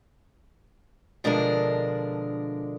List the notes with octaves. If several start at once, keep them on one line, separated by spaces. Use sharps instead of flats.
B2 D3 F3 G#3 D4 A#4